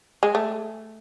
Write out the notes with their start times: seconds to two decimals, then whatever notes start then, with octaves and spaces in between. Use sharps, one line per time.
0.23 G#3
0.35 A3